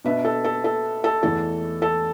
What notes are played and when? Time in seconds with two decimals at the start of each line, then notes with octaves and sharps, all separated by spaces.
0.05 B2 B3 D4 B4 E5
0.25 A4
0.44 A4
0.64 A4
1.04 A4
1.23 E2 E3 A3 A4
1.82 A4